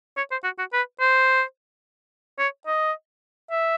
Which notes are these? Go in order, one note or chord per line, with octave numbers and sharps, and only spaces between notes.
C#5
C5
F#4
F#4
B4
C5
C#5
D#5
E5